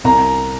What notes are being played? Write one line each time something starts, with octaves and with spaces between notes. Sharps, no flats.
C2 A#5